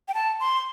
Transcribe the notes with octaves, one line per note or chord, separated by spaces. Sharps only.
G5
A5
C6